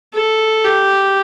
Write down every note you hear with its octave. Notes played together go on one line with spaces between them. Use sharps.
A4
G4